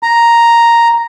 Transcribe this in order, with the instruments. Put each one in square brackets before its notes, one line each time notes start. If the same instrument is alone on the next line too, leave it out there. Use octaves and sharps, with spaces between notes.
[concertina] A#5